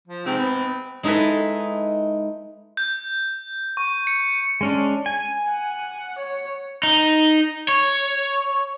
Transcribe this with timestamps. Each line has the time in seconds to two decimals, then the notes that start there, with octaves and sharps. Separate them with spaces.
0.08 F3
0.26 G#2 C3 C4
0.39 B3
1.03 G#3 D#4 E4 A4 B4
2.77 G6
3.77 C#6
4.07 C#7
4.61 G#3 C#4 D4
5.06 G#5
5.50 F#5
6.19 C#5
6.83 D#4
7.69 C#5